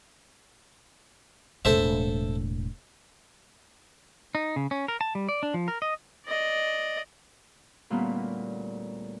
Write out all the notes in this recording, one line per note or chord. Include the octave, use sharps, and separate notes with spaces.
E1 A2 A4 C5 E5
D#4
C#3
C#4
A#4
A5
G3
D5
D4
F3
A#4
D#5
D5 D#5
D2 A#2 G3 A#3 B3 C#4